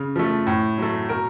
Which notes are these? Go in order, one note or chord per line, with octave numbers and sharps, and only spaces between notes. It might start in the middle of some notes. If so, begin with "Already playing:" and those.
Already playing: C#3
F3 A3
A2
F#3 A3
B2 A#4